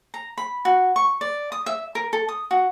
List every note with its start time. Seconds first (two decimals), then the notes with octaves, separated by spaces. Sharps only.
0.14 A#5
0.38 B5
0.65 F#4
0.96 C#6
1.21 D5
1.52 D#6
1.66 E5
1.95 A#4
2.13 A4
2.29 D#6
2.51 F#4